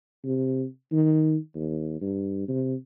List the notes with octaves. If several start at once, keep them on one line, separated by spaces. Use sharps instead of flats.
C3
D#3
D#2
G2
C3